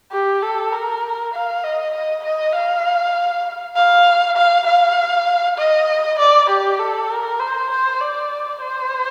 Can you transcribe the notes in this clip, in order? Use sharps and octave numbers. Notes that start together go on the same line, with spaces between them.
G4
A4
A#4
F5
D#5
D#5
D#5
F5
F5
F5
F5
D#5
D5
G4
A4
A#4
C5
C5
D5
C5